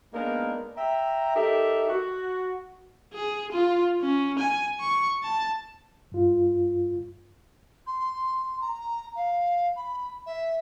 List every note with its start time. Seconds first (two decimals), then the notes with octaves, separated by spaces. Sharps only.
0.13 G#3 A#3 B3 D4 D#4 A#4
0.77 E5 G5 A#5
1.35 D#4 G4 A4 A#4 E5
1.88 F#4
3.13 G#4
3.52 F4
4.01 C#4
4.39 G#5
4.80 C#6
5.23 A5
6.12 G2 F4
7.86 C6
8.61 A#5
9.15 F5
9.76 B5
10.26 E5